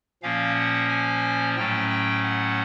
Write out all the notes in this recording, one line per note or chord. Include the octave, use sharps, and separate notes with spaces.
A#2 F3 A#3 C#4 F5
F#5
G#5
A2 F#3 A3 C#4 G5
G5
F#5